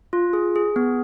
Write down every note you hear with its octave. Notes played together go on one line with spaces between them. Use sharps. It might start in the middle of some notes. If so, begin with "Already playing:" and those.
F4
G#4
G#4
B3